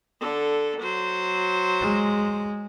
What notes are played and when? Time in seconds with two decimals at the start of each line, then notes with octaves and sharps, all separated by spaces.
0.21 D3 A4
0.81 F#3 C5
1.81 G#3